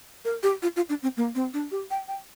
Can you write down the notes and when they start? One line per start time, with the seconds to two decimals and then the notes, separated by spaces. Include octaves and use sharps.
0.25 A#4
0.43 G4
0.62 F4
0.76 F4
0.89 D4
1.03 C4
1.17 A#3
1.35 C4
1.54 D4
1.71 G4
1.91 G5
2.08 G5